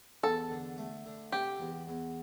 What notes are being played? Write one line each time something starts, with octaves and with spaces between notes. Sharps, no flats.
E2 A4
D3
A3
D3
C3 G4
E2
E2